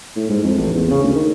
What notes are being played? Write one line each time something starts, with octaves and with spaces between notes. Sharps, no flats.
A2
G#2
F2
A1
E2
C#3
D2
D#3